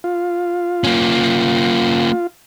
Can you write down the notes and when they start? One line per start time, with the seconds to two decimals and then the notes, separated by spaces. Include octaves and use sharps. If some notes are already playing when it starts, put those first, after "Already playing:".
0.04 F4
0.84 A#3 C#4